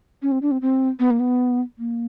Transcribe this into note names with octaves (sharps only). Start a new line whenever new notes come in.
C#4
C4
D4
C4
C4
B3
A#3
B3
A#3